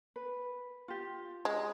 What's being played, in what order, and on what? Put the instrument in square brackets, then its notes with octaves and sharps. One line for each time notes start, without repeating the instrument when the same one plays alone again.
[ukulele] B4
F4 G4
[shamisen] G#3